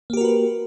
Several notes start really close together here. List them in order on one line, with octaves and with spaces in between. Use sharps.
A#3 G4 A#4 F#4 B4